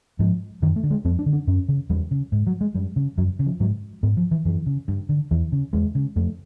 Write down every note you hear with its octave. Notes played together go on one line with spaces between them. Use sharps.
G#2 F3
F#2 D#3
A3
D3
G#3
F2 C4
D4
D3
D4
F#2 C#4
C#3
E2 G3
C#3
G#2
F#3
G#3
F#2 G3
C#3
F#2 F#3
C#3
F3
G#2 F#3
G#2 B3
F3
E3
F#2 E3
C#3
G2
D3
E2 E3
C#3
E2 G#3
C#3
F2 A3